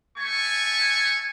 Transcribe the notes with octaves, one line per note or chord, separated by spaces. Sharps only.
A3 G#5 C#6